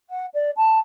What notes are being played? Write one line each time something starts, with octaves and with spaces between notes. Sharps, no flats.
F#5
D5
A5